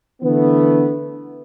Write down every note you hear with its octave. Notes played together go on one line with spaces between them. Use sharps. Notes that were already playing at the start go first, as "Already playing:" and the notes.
D3 E3 A3 B3